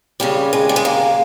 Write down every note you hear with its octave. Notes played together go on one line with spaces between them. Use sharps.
D#2 C#3 G3
G#3
G3
G#3
A#3